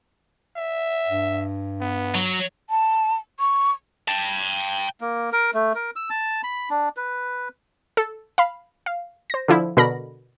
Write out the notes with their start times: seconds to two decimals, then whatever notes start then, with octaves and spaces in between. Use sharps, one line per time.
0.57 E5
1.07 G2
1.81 B3
2.14 F#3
2.70 A5
3.40 C#6
4.08 G5 A5
5.01 A#3
5.32 A#4
5.54 A3
5.75 A#4
5.96 E6
6.10 A5
6.44 B5
6.70 D4
6.97 B4
7.97 A4
8.38 F5 B5
8.86 F5
9.30 C5 A#6
9.48 D3 F3 E4
9.77 B2 D3 A#4 B5 A#6